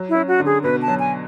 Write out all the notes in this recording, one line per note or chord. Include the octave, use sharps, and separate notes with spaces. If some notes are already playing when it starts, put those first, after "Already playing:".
Already playing: F#3
E4
C#4
F#4
D3
G#4
B2 B4
A5
F#3
G#5